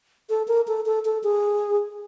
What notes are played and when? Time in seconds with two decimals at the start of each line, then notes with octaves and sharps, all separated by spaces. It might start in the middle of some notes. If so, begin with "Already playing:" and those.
0.29 A4
0.48 A#4
0.67 A4
0.86 A4
1.05 A4
1.23 G#4